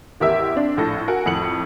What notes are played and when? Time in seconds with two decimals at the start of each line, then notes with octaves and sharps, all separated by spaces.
0.20 A1 E2 G4 A#4 E5 E6
0.55 C4 D4
0.77 A#1 A2 A4 A#6
1.08 F#4 A#4 F#5 G#5
1.26 F2 A2 C#7 F#7